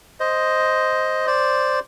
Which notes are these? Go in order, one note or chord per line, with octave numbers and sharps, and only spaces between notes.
C5 D#5
C5 D5